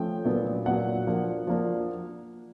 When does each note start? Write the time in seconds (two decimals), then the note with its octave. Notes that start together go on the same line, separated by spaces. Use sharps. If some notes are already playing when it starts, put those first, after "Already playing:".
Already playing: F3 A3 C#4 G5
0.25 A#2 F#3 B3 D4
0.66 A#2 F#3 B3 D4 F#5
1.07 F3 A#3 D4
1.47 F3 A#3 D4